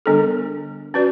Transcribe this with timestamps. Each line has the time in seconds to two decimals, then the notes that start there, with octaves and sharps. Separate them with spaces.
0.06 D3 G3 B3 D4 A4
0.94 C#4 F#4 B4 D5